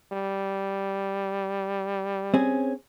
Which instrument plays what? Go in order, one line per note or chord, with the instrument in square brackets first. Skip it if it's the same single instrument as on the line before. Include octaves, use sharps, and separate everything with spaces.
[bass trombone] G3
[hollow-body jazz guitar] C4 C#4 G#4